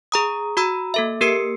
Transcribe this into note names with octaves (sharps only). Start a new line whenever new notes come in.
G#4 A#5 D#6
F#4 A#5 B5 E6
A#3 A4 E5
A#3 G4 A#4 E6 C7 C#7